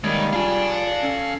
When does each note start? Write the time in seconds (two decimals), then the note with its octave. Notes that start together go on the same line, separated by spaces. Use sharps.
0.04 D#3 G3 G#3 A#3 B3 C#5 D#5
0.33 D4 F4 G#4 F5 G#5
1.03 C#4 A4